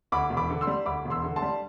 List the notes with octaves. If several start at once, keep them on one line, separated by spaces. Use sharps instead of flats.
D2 B5 D6
E1
B5 D6
D3
C6 E6
G3
D2 B5 D6
E1
C6 E6
D3
A5 C6
G3